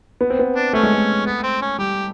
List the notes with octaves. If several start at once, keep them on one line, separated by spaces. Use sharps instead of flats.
B3
C4
B3
D4
A3 C#4
G#3
A3
B3
C4
C#4
G3 G4